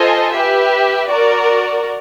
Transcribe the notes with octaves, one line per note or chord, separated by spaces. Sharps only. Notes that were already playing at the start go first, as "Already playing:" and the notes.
Already playing: F4 A4 C5 D#5 G#5
G4 B4 E5
F#4 A#4 D5